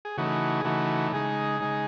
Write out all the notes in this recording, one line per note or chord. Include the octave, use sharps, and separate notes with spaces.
G#4
C#3 E3 A3 D#4 F#4
G#4
C#3 E3 A3 D#4 F#4
C#3 G#3 D#4 G#4
C#3 G#3 D#4